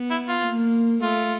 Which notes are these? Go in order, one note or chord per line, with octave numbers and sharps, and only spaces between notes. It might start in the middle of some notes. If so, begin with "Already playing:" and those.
Already playing: B3
E4
F4
A#3
A3 F4